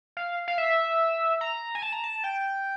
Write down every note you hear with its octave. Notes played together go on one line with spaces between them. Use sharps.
F5
F5
E5
A#5
G#5
A5
A#5
A5
G5